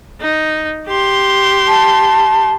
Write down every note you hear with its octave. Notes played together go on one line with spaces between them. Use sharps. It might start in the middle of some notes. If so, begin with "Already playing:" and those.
D#4
G4 C6
A5